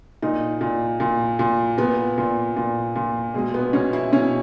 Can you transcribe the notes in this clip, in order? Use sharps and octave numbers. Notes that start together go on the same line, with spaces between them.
A#2 D#4
A#2
A#2
A#2
A#2 B3
A#2
A#2
A#2
B2 G#3
B3
B2 C#4
E4
B2 C#4